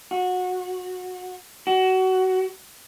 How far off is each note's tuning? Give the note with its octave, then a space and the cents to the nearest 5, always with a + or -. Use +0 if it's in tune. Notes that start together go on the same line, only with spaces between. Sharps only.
F#4 -20
F#4 +20